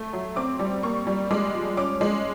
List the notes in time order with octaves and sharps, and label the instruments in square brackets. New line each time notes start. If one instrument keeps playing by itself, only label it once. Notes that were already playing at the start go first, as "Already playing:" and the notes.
Already playing: [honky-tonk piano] A3
F#3
C4 D6
G3
A#3 C#6
G3
G#3 D6
F3
C#4 D6
G#3